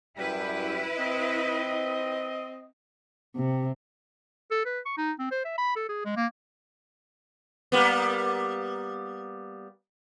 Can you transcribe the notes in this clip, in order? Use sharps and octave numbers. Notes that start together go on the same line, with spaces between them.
F#2 G3 E4 B4 G5
C4 D#5
C3
A4
B4
C#6
D#4
C4
C5
E5
B5
A4
G#4
G#3
A#3
G3 A#3 B3